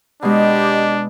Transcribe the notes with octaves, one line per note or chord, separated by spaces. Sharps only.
B2 G#3 D4 G4 D#5